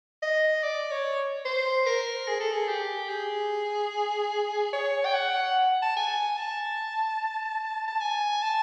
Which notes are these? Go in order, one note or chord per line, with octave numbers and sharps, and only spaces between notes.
D#5
D5
C#5
C5
A#4
G#4
A4
G#4
G4
G#4
C#5
G5
F#5
A5
G#5
A5
A5
G#5
A5